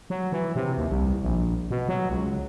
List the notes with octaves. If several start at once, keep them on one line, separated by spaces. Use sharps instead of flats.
F#3
E3
C3
D#2
C2
A#1
B2
F#3
C#2